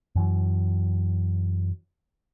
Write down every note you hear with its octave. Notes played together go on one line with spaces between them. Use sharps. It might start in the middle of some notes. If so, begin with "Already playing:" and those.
F#2 E3 F#3